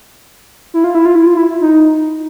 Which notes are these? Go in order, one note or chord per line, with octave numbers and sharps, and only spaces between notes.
E4
F4
E4
F4
E4
F4
E4
D#4